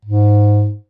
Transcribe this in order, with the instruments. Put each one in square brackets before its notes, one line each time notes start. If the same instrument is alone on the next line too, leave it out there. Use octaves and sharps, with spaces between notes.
[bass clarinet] G#2